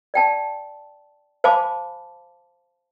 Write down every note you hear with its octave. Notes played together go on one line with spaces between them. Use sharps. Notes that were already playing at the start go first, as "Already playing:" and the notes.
D5 G5 A5
C5 F5 G#5 A5 B5 D6